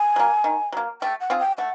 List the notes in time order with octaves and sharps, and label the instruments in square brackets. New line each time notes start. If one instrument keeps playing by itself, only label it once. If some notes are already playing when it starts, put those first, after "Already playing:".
Already playing: [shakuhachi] G#5
[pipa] F#3 A#3
D#3
F#3 A#3
[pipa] A3 [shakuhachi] G5
[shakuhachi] F#5
[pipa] C4 F4 G#4
[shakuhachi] G5
[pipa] A3 [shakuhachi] F#5